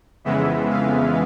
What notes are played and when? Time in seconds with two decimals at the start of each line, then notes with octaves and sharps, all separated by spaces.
0.24 F2 C#3 E3 G#3 B3 E5
0.70 F5